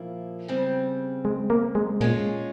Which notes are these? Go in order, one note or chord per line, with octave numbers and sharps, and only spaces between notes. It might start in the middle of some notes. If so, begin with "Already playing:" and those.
Already playing: A#2 F3 A#3 E4
C#3 G3 C4
G#3
A#3
G#3
A#2 G#3 C#4 F4